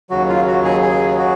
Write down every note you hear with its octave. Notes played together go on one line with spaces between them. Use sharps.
D#2 C#3 F#3 F#4
F4
F#4
G#4
G#4
F#4